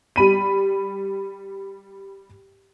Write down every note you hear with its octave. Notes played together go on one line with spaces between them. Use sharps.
G3 B5 D#7